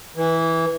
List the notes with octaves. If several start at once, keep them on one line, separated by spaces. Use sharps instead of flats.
E3